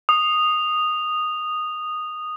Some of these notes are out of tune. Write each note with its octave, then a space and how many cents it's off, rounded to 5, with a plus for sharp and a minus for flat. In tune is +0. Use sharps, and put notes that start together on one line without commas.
D#6 -10